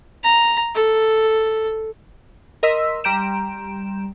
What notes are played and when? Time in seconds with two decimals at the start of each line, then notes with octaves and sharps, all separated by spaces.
0.24 A#5
0.75 A4
2.63 A#4 D#5 C6 E6 B6
3.04 G3 A#5 C6 G6 D7 E7